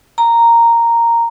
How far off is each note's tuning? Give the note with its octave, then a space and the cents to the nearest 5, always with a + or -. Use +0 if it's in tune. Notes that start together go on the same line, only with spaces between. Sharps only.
A#5 -5